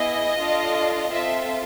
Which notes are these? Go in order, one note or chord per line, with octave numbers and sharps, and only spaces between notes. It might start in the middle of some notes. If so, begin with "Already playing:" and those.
Already playing: B3 E4 G#4 D#5
D4 F4 A4
C4 F4 A4 E5